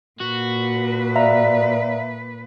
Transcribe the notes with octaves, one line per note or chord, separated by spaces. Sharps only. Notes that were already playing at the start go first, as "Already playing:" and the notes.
A#2 F#4 B4
D5 E5 F5 A#5